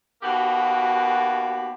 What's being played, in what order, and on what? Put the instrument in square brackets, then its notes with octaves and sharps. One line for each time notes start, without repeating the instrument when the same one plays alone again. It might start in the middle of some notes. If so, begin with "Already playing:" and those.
[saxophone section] D#2 B2 A#3 F#4 G4